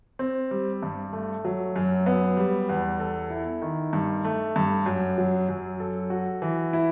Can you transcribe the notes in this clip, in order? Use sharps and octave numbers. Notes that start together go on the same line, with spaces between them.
C4
G3
G2
A3
F#3
F#2
B3
G3
E2
A4
E4
D#3
G2
A3
G2
F#2
F#3
F#2
A4
F#4
E3
E4